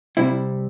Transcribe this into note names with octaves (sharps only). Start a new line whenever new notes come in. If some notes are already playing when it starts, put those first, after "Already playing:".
C2 C3 G3 C4 E4